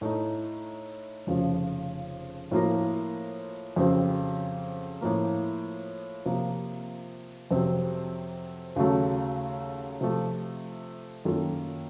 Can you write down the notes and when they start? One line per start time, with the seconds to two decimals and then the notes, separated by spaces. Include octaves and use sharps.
0.01 A2 A3 D#4
1.27 F1 F2 C#3 F3
2.51 A2 F3 A#3 F4 A#4
3.76 F2 C#3 F#3 C4
5.01 A2 F3 A#3
6.25 C3 F3 A#3
7.51 F2 C3 F#3 C4
8.76 D#2 C#3 F#3 A3
10.01 C3 F3 A3
11.25 F#2 D#3 A#3 F4 A4